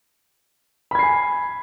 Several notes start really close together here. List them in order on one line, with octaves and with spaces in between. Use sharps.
B5 G#6 C7 G#5